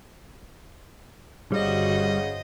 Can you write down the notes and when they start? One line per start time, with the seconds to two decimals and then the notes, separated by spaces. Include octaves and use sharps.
1.52 G1 C#3 G3 F#4 C5 D#5